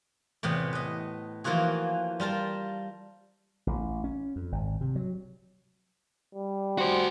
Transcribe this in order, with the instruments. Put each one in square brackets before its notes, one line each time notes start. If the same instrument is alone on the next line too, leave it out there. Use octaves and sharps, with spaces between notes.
[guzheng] E2 A2 C3 B3 G5
B4 D#5
E3 F3 A#3 F4 F#4 G#4
G3 F4 A#4 A5
[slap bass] A1
C#4
F2
G#1
C3
F#3
[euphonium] G3
[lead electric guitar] F#4 C5